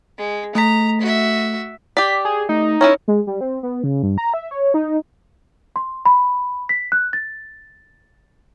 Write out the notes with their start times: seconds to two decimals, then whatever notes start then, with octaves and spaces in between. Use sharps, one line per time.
0.18 G#3
0.55 A3 A#5 B6
1.01 F#4 E5
1.97 G4 D5 B6
2.25 G#4
2.49 A3 D#4
2.81 C#4 E4 A#4 C#5
3.08 G#3
3.27 G3
3.41 C4
3.63 B3
3.84 C#3
4.03 G2
4.18 A#5
4.34 E5
4.51 C#5
4.74 D#4
5.76 C6
6.05 B5
6.69 B6
6.92 F#6
7.13 A6